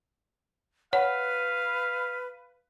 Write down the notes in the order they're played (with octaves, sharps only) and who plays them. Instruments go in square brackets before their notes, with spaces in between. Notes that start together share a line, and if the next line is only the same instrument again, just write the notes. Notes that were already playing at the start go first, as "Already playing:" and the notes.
[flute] B4 [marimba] C#5 F#5 [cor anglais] F5